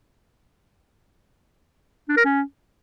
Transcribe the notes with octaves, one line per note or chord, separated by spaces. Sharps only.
D4
A#4
C#4